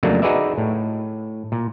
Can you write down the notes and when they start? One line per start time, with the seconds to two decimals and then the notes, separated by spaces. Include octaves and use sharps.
0.03 F2 C#3 F#3 A3 A#3 D4
0.22 D#4 F#4 G#4 B4 D5 E5
0.58 A2
1.52 A#2